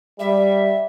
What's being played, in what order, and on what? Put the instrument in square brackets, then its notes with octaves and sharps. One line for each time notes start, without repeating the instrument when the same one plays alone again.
[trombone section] G3 [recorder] E5